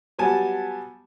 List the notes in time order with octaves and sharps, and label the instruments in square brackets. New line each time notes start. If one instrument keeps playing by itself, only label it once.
[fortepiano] F#3 G3 B3 G#5 A5